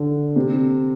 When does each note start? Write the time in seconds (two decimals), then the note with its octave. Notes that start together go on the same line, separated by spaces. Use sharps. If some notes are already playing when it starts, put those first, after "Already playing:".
Already playing: D3
0.36 C3